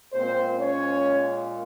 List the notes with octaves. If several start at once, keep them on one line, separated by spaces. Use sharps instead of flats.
A#2 G#3 C4 C5
C#4 C#5